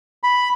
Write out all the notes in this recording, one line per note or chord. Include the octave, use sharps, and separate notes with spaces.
B5